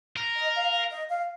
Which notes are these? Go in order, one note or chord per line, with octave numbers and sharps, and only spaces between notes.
A#4
D#5
F5
F5
D#5
F5